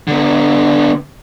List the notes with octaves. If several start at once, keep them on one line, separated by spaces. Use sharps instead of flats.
D3 B3